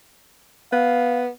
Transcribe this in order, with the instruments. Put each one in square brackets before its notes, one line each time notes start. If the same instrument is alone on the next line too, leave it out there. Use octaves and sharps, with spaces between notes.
[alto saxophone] B3 [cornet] F5